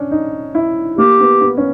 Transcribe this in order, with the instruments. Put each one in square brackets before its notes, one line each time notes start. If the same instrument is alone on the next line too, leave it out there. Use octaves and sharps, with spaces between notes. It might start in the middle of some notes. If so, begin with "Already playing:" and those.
Already playing: [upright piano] C#4 D4
D#4
E4
[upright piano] A#3 [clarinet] G4
[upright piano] B3
B3
C#4